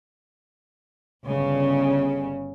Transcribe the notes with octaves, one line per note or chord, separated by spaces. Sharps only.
G1 C#3